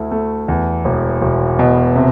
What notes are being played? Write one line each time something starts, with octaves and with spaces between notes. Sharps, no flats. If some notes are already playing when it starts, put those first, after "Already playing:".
Already playing: D2 A3 E4
A3
E2
E1
E1
B2
C3